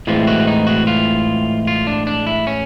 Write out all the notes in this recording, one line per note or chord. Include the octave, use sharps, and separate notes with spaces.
A2 E3 G#3 C4 F4
F#4
D#4
F#4
F4
F4
D4
D4
E4
C#4